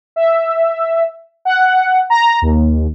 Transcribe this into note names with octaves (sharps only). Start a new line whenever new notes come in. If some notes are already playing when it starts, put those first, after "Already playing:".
E5
F#5
A#5
D#2